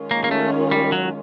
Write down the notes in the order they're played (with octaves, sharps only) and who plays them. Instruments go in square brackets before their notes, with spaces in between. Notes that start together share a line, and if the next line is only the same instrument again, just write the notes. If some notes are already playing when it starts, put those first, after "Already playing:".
Already playing: [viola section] D#3 G#3 C#4 F4
[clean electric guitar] A#3
A#3
A3
G3
F#3